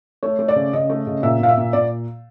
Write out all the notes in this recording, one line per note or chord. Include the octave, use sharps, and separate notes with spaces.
A3 C#5
A3
D5
C#3
C#3 D#5
A3
C#3
A#2 E5
A#2 F5
E5
A#2
A#2 D5